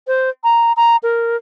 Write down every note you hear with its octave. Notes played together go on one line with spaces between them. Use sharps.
C5
A#5
A#5
A#4